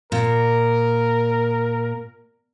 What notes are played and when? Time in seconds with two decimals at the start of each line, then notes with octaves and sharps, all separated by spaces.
0.12 A#2 A#4